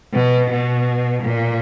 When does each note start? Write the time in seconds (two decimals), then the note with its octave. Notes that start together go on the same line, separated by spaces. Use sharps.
0.14 B2
0.50 B2
1.22 A#2